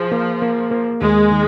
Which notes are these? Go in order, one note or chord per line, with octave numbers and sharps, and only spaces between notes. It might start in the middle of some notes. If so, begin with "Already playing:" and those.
Already playing: F3 G#4
A#3
A#3
A#3
D#2 G#3
D#3